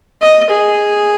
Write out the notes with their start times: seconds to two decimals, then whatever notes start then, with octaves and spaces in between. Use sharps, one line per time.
0.22 D#5
0.50 G#4